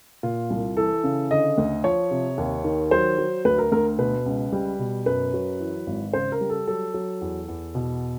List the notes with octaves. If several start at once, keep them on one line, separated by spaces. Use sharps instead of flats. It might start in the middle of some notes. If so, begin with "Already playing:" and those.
A#2 F4
C2
E3 A4
C#3
D3 D#5
D2
F3 C#5
C3
D#2
D#3
F#3 C5
F#3
D2 B4
A#4
D2 A#4
B2 B4
C#2
G3
B2
F#2 B4
F#3
E3
G#1
C#3 C5
A#4
G3
A4
F#3 A4
F#3
E2
E2
B2